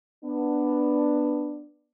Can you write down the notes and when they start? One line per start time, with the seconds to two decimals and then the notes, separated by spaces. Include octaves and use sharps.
0.24 B3 D4